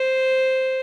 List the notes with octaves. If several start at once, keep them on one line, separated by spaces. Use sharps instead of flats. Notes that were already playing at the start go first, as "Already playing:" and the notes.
Already playing: C5